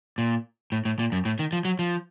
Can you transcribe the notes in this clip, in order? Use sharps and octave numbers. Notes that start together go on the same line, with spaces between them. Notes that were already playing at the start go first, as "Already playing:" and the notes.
A#2
A2
A2
A#2
F#2
A2
D#3
F3
F#3
F3